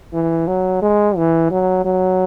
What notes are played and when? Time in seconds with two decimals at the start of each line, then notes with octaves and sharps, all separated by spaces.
0.13 E3
0.47 F#3
0.82 G#3
1.17 E3
1.51 F#3
1.85 F#3